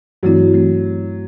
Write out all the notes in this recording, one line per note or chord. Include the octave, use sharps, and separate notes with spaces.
G2 E3 F#3 A3 C4 E4
E3 A3 C4 G4